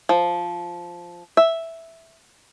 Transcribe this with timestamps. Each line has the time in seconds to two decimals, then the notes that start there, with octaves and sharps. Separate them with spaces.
0.09 F3
1.37 E5